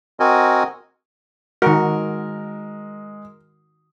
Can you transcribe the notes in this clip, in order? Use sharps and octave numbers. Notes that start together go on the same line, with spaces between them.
C4 F#4 A#4 D#5 G#5
D#3 G#3 F#4 A#4